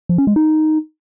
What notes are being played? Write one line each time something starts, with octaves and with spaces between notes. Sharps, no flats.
F3
C#4
G#3
D#4